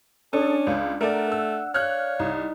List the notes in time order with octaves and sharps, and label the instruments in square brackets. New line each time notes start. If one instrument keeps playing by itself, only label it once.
[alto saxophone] C#4 [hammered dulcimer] D4 [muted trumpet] G#4 [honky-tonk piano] A4
[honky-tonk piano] C#2 [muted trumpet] F5
[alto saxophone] A3 [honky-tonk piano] A#4 D5 [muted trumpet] F#5
[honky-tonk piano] E6
[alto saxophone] C#5 [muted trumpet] F5 [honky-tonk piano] F6 F#6
[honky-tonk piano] C2 [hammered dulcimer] D#4